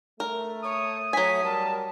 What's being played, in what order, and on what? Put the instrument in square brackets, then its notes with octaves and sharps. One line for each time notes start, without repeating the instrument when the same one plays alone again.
[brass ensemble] A3 [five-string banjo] A#4
[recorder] C#5 [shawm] D#6
[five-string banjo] F#3 G#5 [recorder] B6
[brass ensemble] G3 A#4 [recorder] A5